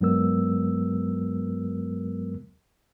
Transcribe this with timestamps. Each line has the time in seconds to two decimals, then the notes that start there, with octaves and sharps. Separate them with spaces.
0.01 G2 F#3 G#3 B3 A#4 E6